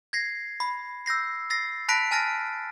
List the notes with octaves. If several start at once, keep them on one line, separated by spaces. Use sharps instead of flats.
G#6 A#6 C7
B5
E6 G6 A#6 C7
E6 A6 A#6 C7
A5 B5 F#6 A#6 B6 D7
G#5 A5 F6 A6 A#6 D7